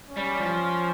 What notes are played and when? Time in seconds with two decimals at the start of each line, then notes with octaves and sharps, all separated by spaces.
0.09 C#4
0.17 G3
0.39 F3